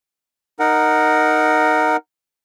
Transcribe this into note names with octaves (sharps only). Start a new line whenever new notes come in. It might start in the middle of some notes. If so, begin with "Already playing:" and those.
D#4 A#4 F#5